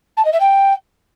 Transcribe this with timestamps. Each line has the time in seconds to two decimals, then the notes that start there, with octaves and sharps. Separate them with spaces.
0.17 A5
0.25 D#5
0.32 E5
0.40 G5